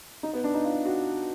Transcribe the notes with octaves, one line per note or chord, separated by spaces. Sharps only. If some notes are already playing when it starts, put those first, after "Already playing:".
D#4
B3
D4
D#4
F4
F#4